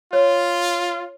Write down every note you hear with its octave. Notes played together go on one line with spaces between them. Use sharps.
F4 C#5